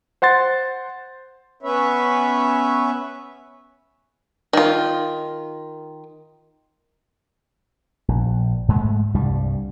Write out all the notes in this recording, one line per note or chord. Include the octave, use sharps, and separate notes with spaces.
C5 F#5 C6 A6
B3 C#4 B4 C#5 E5
D#3 F4
A#1
G#2 G#3 A3
C2 G2 G3